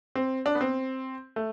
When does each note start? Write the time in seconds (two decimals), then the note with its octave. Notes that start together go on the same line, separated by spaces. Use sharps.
0.15 C4
0.46 D4
0.55 B3
0.61 C4
1.36 A3